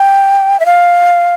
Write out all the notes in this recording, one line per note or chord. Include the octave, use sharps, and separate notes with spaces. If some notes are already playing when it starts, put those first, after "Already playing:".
Already playing: G5
E5
F5